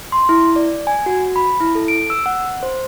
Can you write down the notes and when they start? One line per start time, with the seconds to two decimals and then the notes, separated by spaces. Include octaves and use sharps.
0.12 C6
0.29 E4
0.56 D5
0.87 G#5
1.06 F#4
1.36 B5
1.60 E4
1.75 A4
1.88 D7
2.10 E6
2.26 F#5
2.63 C5